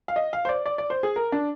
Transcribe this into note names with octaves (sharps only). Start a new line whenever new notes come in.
F5
D#5
F5
C5
D5
D5
D5
C5
G#4
A#4
D4